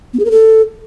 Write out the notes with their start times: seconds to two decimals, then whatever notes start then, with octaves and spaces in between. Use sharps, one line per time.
0.14 B3
0.19 G#4
0.25 A#4
0.31 A4